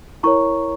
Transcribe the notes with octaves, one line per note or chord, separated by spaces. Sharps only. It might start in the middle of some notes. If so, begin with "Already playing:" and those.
E4 A#4 C#5 A#5 C#6